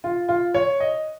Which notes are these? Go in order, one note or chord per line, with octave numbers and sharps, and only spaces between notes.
F4
F4
C#5
D#5